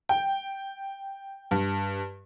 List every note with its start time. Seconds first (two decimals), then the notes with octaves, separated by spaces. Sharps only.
0.09 G5
1.51 G2